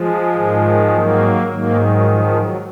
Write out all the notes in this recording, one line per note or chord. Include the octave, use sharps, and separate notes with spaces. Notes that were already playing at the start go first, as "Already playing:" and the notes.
Already playing: F3 G#3
G#2 D#3
F#3 A#3
G#2 D#3 F#3 A#3
F#3
F3
F#3